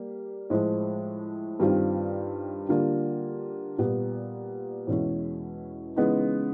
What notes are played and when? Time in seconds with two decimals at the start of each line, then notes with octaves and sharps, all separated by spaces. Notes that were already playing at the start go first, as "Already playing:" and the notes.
Already playing: G3 A#3
0.50 A2 F3 G#3
1.60 G2 D#3 G3 C4 F4
2.69 D3 G3 A#3 D4 F4
3.78 A#2 G3 B3
4.87 E2 B2 G#3 C#4 E4
5.96 C#3 E3 G#3 B3 D#4